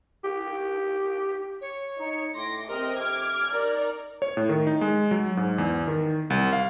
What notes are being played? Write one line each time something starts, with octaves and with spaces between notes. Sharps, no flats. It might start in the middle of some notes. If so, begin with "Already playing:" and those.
G4
C#5
D#4
A2 C6 D6 A#6
F2 C3 C4 G4 A#4 D#5
D6 F6 G#6
D#4 A#4 D5
C#5
A2
D#3
D#4
G#3
F#3
G#2
E2
D#3
C2
F5